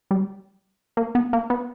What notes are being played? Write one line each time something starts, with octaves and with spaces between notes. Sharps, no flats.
G3
A#3
B3
A#3
B3